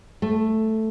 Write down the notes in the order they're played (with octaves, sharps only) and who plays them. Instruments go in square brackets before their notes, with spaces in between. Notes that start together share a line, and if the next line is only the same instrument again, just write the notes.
[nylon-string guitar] A3